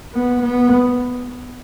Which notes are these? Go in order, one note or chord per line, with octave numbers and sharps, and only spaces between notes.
B3
B3